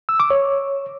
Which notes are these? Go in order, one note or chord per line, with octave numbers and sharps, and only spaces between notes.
E6
D6
C#5